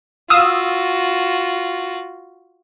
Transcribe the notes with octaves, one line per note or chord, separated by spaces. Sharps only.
F4 F#4 F5 D#6 E6